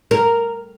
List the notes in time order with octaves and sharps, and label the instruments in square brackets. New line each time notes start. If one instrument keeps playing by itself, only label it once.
[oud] A#4